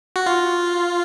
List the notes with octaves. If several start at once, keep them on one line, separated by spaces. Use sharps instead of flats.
F#4
F4